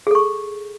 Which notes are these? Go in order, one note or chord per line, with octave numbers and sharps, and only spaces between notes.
G#4 A4 C#6